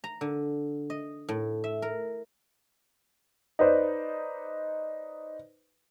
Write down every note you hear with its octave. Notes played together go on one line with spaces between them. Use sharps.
A#5
D3
D#5
A2
E5
A#4
D#4 B4 C5 D5